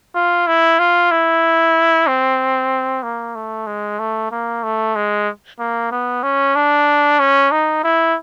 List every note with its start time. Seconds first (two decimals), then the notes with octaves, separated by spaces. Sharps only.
0.15 F4
0.47 E4
0.79 F4
1.11 E4
2.07 C4
3.03 A#3
3.35 A3
3.67 G#3
3.99 A3
4.31 A#3
4.63 A3
4.95 G#3
5.59 A#3
5.91 B3
6.23 C#4
6.55 D4
7.20 C#4
7.52 D#4
7.84 E4